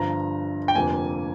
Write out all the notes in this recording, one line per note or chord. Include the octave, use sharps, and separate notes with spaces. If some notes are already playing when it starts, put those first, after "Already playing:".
Already playing: G1 G2 D3 F3 A#5
G5
F1 F2 D3 F3 A#3 G#5